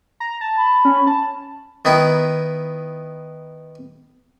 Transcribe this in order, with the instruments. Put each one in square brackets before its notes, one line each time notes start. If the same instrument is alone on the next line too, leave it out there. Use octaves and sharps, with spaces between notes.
[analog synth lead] A#5
A5
[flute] B5
[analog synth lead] C#4
A5
[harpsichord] D#3 B3 D#4 E4